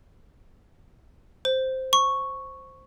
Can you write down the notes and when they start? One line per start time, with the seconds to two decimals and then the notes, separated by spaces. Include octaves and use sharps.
1.45 C5
1.93 C#6